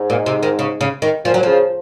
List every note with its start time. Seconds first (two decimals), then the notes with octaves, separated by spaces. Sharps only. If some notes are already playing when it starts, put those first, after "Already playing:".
Already playing: G#2
0.10 A#2
0.26 C3
0.43 D#3
0.59 C#3
0.81 C#3
1.02 D#3
1.25 A#2 F3
1.34 F#3
1.43 C#3 F3